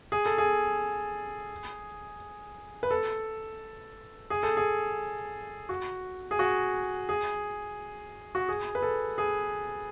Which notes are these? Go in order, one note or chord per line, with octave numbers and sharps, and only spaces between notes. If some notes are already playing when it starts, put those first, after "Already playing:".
G#4
A4
G#4
B4
A4
G#4
A4
G#4
F#4
G#4
F#4
G#4
F#4
G#4
B4
A4
G#4